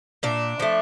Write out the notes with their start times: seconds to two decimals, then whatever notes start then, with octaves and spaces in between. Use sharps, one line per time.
0.23 A#2 D4
0.60 F3 A3